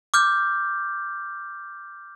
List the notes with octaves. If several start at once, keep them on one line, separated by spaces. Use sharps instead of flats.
D6 F6 G6